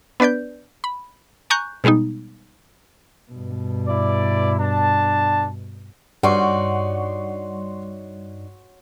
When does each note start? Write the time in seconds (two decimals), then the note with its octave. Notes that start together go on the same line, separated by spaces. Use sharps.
0.20 B3 D4 B4 D5 G6
0.84 B5
1.50 G#5 A#5 C#6 F#6 G6
1.84 B2 G3 G#3 B3 D#4
3.31 G2 B2
3.88 E4 D5
4.60 D4 A5
6.23 G2 D#4 F#4 C#5 D5 F#5 C6 C#6